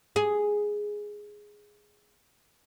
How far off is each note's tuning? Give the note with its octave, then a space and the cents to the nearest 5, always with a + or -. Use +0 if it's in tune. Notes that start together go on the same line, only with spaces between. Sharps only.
G#4 +0